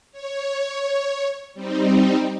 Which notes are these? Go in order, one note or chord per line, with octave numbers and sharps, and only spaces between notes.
C#5
G3 C4 D#4